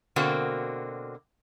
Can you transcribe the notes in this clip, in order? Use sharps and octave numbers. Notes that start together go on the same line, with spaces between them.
B2 D3 A#3 C4 F#4